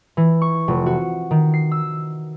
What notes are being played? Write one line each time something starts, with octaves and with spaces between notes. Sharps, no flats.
E3
C#6
F1
F#4
D#3
C7
E6